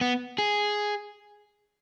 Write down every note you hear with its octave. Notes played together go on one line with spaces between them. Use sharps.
B3
G#4